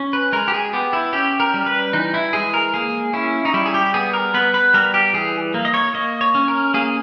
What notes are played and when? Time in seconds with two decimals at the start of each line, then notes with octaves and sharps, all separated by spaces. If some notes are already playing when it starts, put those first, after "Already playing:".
Already playing: C#4
0.13 B4
0.32 G#3 A#4
0.48 G4
0.54 G#4
0.73 B3 G4
0.93 E4
1.13 C#4 G4
1.40 A#4
1.54 G3
1.66 B4
1.93 E3 D#4
2.14 E4
2.33 G#3 G#4
2.54 A#4
2.74 A#3 G#4
3.13 C#4 E4
3.45 D#4
3.54 G3 E4
3.66 G#4
3.74 G4
3.94 B3 G#4
4.13 A#4
4.34 B3 B4
4.54 B4
4.74 G3 A#4
4.94 G4
5.13 E3 G#4
5.54 A#3
5.65 D#5
5.74 C#5
5.94 A#3 D#5
6.21 C#5
6.35 C#4
6.48 A#4
6.74 A#3 G#4